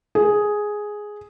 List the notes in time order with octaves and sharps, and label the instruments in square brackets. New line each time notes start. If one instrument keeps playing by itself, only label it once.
[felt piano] G#4